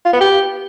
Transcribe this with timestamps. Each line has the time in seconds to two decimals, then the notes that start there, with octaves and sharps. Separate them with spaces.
0.05 F4
0.13 B3
0.21 G4